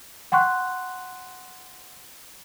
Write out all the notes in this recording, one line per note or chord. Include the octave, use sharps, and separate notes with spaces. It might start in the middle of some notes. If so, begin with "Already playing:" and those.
F#5 G5 C6 C#6 F#6